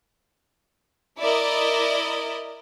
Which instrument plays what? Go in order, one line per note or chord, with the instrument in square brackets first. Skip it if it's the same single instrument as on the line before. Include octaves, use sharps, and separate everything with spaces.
[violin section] E4 A#4 D5 D#5